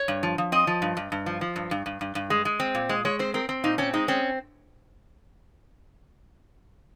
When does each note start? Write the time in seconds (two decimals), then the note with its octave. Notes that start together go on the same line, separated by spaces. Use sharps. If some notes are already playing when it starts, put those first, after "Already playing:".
Already playing: C#5
0.08 G2
0.23 F3
0.38 F3
0.52 C4 D#5
0.67 F3
0.82 G2
0.97 G2
1.12 G2
1.26 F3
1.41 F3
1.56 G2
1.71 G2
1.86 G2
2.01 G2
2.15 G2
2.30 G#3
2.45 G#3
2.60 C4
2.75 A#2
2.89 G#3 D#5
3.05 G#3 C#5
3.19 C4 C5
3.34 C4 A#4
3.49 C4
3.64 A#2 D#4
3.78 C4 C#4
3.93 G#3 D#4
4.08 C4 C#4